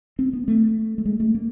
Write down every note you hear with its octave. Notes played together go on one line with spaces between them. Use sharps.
C4
B3
A3
A3
G#3
A3
A#3